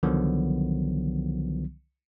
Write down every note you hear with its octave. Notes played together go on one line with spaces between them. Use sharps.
C2 D3 D#3 F3 F#3 B3